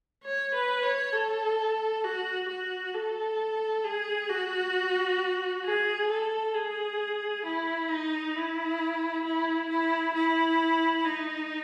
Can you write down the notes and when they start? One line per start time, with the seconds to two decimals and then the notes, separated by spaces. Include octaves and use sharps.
0.24 C#5
0.55 B4
0.83 C#5
1.14 A4
2.05 F#4
2.49 F#4
2.94 A4
3.84 G#4
4.30 F#4
5.64 G#4
6.10 A4
6.54 G#4
7.44 E4
7.90 D#4
8.35 E4
9.25 E4
9.69 E4
10.14 E4
11.05 D#4